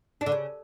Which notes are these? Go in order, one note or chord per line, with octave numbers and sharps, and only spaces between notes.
D4
D3
C#3